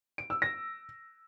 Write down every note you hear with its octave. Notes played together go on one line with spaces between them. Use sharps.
D7
E6
A#6